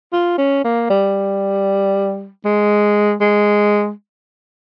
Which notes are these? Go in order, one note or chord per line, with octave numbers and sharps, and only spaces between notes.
F4
C#4
A#3
G3
G#3
G#3